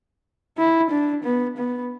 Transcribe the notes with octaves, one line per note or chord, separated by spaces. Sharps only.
E4
D4
B3
B3